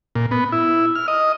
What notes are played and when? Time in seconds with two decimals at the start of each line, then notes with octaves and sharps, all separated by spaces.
0.15 A#2
0.31 B3
0.52 E4
0.95 F6
1.08 D#5